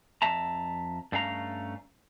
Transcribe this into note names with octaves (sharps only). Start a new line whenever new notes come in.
F2 E5 A5 A#5
G2 A3 C#4 F5 A#5